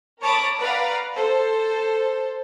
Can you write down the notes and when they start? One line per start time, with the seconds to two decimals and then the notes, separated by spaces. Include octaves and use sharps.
0.21 A#4 C#5 A5 B5 D6 D#6
0.58 B4 D5 F5 F#5 A#5
1.14 A4 C5